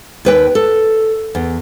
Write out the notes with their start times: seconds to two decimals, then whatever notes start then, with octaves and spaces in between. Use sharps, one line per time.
0.25 D#2 B4 G5
0.55 A4
1.35 E2